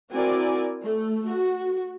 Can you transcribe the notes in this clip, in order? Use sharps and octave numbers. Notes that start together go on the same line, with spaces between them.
C4 E4 F#4 A#4 D5 G#5
A3
F#4